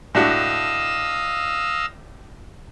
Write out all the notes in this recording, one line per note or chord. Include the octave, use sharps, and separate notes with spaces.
A2 D4 F#4 D#5 F5 E6